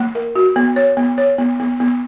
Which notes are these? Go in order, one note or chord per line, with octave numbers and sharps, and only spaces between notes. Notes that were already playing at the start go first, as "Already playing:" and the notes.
Already playing: A#3
A#4
F#4
B3
C#5
B3
C#5
B3
B3
B3